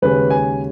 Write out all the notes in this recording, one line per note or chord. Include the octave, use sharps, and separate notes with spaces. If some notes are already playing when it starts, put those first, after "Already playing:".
D#2 C#3 G#3 C#4 B4
G#5